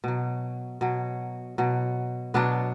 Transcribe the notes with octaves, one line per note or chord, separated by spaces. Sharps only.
B2 F#3
B2 F#3
B2 F#3
B2 F#3 B3 D4